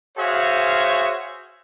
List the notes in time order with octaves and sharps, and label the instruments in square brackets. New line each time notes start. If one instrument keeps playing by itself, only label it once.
[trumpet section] F#4 G#4 C5 C#5 E5 F5